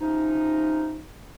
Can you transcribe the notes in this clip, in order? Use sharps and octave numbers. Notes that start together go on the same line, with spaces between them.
C3 F3 C#4 D#4